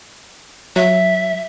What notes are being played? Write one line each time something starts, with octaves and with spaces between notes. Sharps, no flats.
F#3 E5